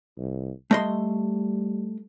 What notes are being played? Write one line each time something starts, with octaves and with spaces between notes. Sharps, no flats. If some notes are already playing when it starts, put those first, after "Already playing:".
C2
G3 A3 D#5 C6